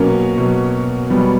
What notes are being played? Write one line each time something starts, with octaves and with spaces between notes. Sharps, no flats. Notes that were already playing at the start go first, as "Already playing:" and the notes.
Already playing: B2 F#3 A#3 C#4
B2 F#3
B2 F#3 G3 B3